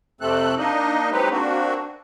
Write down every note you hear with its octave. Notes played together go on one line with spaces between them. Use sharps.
F2 C3 A3 C4 A4 F#6
A#3 D4 D#4 D#5
F#3 G#3 C4 D#4 G4 B4
A#3 C4 D4 F#4